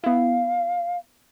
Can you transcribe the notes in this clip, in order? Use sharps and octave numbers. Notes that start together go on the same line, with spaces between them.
B3 E4 F5